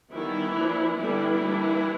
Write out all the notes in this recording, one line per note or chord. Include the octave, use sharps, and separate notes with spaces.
D#3 E3 G3 B3 E4
F3 A#3 D4
D3 E3 G3 B3 D4 E4
G3 A#3 D4